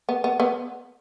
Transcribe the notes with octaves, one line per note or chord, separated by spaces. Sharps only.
B3
B3
B3